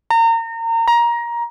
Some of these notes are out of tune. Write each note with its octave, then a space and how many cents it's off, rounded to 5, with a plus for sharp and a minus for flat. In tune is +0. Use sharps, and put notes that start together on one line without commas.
A#5 -30
A#5 +20